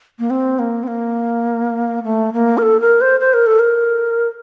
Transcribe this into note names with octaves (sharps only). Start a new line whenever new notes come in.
A#3
C4
A#3
C4
A#3
A3
A#3
A#4
A4
A#4
C5
C5
A#4
A4
A#4